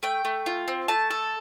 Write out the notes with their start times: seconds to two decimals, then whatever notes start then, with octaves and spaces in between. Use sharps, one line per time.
0.03 A3 G5
0.25 A3
0.46 F4
0.68 C4
0.88 A3 A5
1.11 A4